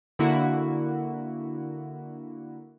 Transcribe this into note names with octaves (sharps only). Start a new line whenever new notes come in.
D3 A#3 E4 F#4